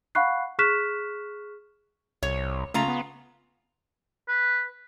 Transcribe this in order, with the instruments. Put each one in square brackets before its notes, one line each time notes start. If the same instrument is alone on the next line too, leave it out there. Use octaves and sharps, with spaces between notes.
[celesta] F5 F#5 B5 C#6 F#6 C7
G#4 C#6 F6 F#6 B6 E7
[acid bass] C2 [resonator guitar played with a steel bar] C#5
[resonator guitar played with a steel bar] C#3 F4 A#5 [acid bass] A3
[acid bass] B3
[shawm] B4